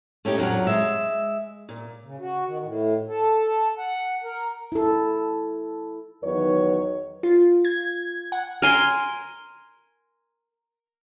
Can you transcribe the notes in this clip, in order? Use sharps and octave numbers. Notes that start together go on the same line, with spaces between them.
A3 C#4 D#4 G4
F2 A#2 F#3
G#3 E5
A#2
C#3
F#4
D#3
A2
A4
F#5
A#4
E4 A4
E2 D#3 F#3 B4 C#5
F4
G#6
F#5
A#4 G#5 C6